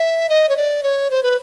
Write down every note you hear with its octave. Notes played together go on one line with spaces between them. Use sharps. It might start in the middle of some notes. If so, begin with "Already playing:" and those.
Already playing: E5
D#5
C#5
D5
C#5
C5
B4